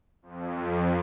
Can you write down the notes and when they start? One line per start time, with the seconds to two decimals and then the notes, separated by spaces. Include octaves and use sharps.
0.22 F2